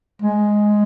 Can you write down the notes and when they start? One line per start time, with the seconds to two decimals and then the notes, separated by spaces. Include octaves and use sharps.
0.22 G#3